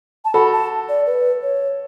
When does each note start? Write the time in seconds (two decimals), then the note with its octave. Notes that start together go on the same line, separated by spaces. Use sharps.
0.25 A5
0.34 F#4 A4 B5
0.53 A5
0.89 D5
1.06 B4
1.43 C#5